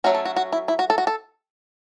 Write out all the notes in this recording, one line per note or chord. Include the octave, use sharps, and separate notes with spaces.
F#3 A3 C#4 F#4
A4
F#4
F#4
E4
E4
F#4
A4
F#4
A4